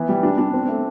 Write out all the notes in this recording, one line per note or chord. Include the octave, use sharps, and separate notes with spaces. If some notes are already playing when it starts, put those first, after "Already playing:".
Already playing: E3 B3
G3
D4
D4
C4
A3